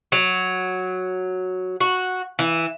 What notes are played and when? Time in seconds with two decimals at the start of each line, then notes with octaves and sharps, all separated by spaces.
0.12 F#3
1.80 F#4
2.39 E3